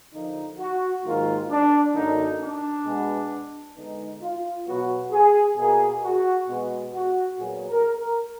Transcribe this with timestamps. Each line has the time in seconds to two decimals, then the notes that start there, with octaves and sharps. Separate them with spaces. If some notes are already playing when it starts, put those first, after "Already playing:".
0.13 D3 F3 A#3 D#4
0.59 F#4
1.04 G#2 D#3 F#3 A#3 F4
1.50 D4
1.95 F#2 D3 F#3 A#3 D#4
2.40 D4
2.85 B2 G#3 B3
3.76 D3 G#3 B3 D#4
4.22 F4
4.66 B2 F#3 B3 F#4
5.12 G#4
5.57 B2 A#3 G#4
6.03 F#4
6.47 B2 G#3 B3
6.94 F#4
7.39 A#2 F#3 B3 G#4
7.69 A#4
7.99 A#4